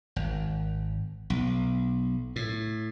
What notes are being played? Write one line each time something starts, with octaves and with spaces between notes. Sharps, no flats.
G#1
B1
A2